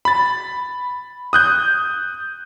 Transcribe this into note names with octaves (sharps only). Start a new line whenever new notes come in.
B5 A6
D#6 F#6 G6